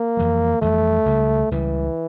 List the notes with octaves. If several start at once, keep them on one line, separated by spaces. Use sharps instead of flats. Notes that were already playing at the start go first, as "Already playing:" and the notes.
Already playing: A#3
F2 E3 G3
F2 E3 G3 A3
C#2 C#3 G3
C#2 C#3 E3 G3